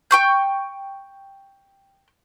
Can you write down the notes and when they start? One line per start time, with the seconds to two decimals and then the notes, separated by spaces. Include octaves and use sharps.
0.11 G5 C#6 G6